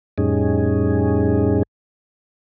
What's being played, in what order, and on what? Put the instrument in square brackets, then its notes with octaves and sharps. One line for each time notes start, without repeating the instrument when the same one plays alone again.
[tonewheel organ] F2 A2 G3 C#4 D#4 G#4